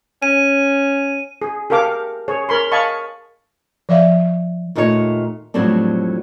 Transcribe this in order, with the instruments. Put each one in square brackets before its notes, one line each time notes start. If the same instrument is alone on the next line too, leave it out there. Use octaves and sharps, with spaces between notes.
[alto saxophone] C#4 [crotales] D#7
[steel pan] G#4
G4 A4 A#4 F5 D6
G#4 C#5
A#4 B5 C6
D#5 F5 G#5 A5 B5 C#6
[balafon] F3 D5 E5 F5
[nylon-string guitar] D#2 A#2 A3 D#4 G4 C#5
F2 A2 F#3 G3 C4 D4